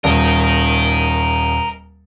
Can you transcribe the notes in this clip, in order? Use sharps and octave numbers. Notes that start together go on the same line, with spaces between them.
D#1 A#4 D#5